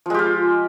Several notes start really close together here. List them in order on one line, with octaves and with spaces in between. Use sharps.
F3 G#3 G4 F4